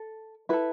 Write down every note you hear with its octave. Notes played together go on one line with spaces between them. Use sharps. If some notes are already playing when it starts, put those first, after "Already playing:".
Already playing: A4
E4 A4 B4